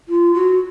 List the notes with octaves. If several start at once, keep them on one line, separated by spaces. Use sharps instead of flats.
F4
F#4